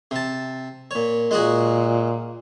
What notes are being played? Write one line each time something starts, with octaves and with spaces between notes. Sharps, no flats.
C3 A5
A#2 C#5
A#2 G#3 F#4 G#4